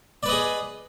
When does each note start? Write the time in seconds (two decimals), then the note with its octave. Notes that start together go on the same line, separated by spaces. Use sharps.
0.23 D5
0.26 B4
0.29 D#5
0.32 G#4